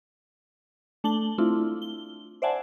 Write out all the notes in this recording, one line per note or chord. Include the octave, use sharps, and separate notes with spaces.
A3 D4 A5 F#7 G7
A3 C4 D4 E4 F4
G7
C5 D5 E5 F#5 G#5 A5